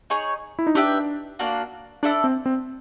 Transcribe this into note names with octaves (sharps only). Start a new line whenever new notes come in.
D#4 G#4 C#5
E4
D#4
D4 G4 B4 E5 G5
A#3 D4 F#4
D4 E4 A4 D5
C4
C4